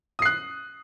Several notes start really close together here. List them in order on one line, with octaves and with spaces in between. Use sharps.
D#6 C7 F#6